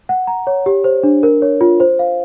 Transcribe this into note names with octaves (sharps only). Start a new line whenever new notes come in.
F#5
A#5
C#5
G4
C5
D4
A#4
C#5
F4
C5
F5